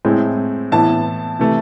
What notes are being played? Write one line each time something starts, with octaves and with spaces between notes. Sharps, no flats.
A2 G#3 C4 E4
A2 E3 B3 E4 A5
C3 E3 A3